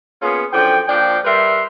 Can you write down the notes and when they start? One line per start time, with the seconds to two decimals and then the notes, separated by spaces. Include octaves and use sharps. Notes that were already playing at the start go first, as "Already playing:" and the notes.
0.21 A#3 B3 C#4 F4 G#4
0.53 F#2 D3 F3 G5
0.88 A#2 F3 D4 G5
1.24 G3 A#4 B4 E5 C6